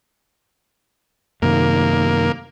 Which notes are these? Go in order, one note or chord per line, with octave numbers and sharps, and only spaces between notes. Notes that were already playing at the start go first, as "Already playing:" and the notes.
F#2 C3 D#3 A#3